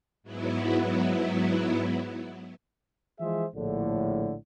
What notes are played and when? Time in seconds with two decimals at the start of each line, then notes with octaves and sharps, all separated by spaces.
0.23 G#2 F#3 B3 E4
3.20 E3 F3 G#3 G#4 C5 E5
3.55 A#1 A2 D3